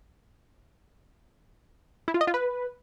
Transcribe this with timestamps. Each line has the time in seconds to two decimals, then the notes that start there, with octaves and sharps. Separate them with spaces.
2.08 E4
2.14 F4
2.21 D#5
2.27 F4
2.34 B4